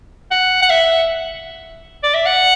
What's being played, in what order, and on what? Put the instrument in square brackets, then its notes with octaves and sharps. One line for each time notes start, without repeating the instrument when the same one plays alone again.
[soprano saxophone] F#5
F#5
E5
D5
E5
F#5